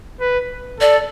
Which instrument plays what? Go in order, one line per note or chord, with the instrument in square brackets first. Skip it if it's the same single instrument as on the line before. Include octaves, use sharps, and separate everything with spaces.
[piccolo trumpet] B4
[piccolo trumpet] A4 [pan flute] D5